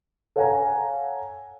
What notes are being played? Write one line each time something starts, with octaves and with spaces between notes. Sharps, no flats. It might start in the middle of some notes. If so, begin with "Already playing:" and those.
A4 C#5 F5 F#5 G#5 A#5